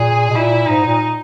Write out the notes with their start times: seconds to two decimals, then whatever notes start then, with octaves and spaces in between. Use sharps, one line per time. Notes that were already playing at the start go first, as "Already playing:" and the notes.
Already playing: A#2 G#4
0.29 B2
0.35 A#2 E4
0.67 G#2 D#4
0.84 A#2